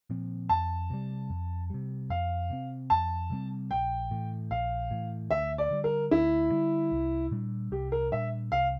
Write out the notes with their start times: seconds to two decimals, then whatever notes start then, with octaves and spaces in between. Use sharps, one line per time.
0.10 A#2 F3 C4
0.49 F2 A5
0.90 C3 G3
1.30 F2
1.70 C3 G3
2.10 F2 F5
2.50 C3 G3 C4
2.90 F2 A5
3.30 C3 G3 C4
3.71 A#1 G5
4.11 A2 E3
4.50 A#1 F5
4.91 A2 E3
5.31 D2 E5
5.58 D5
5.71 D3 G3
5.84 A#4
6.11 D2 E4
6.51 D3 G3
6.92 C2
7.31 A#2 G3 D4
7.71 C2 G4
7.92 A#4
8.12 A#2 G3 D4 E5
8.52 C2 F5